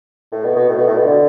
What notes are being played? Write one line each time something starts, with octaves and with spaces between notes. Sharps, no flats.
A2
B2
B2
A2
B2
A2
B2
D3